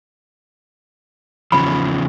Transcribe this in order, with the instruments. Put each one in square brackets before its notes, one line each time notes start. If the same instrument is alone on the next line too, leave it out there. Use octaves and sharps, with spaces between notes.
[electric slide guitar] E2 C#3 F3 [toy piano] B5